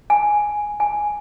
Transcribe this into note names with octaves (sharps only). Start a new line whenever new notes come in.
G#5
G#5